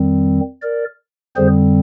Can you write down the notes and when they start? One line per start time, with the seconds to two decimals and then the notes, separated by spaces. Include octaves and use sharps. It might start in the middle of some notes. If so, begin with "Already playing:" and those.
Already playing: F2 D#3 G3 C4
0.62 A#4 D5
1.36 F2 D3 G3 C4 G#4 C5